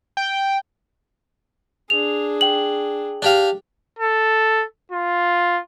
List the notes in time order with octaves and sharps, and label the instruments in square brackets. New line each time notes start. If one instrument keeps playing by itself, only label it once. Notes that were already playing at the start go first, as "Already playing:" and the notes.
[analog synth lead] G5
[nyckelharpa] D4 G#4 [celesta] F7
[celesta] G5 F#7
[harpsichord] D4 G4 F5
[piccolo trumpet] A4
F4